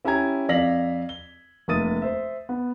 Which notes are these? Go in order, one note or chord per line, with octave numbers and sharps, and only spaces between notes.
C#4 E4 G4 G#5 A#5 G#6
F2 D5 F5 A#6 B6 F#7
G7
F1 A#3 E5 D#6 A6 D#7
C5 E5
B3